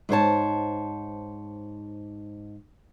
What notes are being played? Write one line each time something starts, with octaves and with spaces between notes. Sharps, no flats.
G#2 C5 C#5 A5